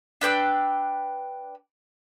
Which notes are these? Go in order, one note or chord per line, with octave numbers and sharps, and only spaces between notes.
D4 B4 G5 E6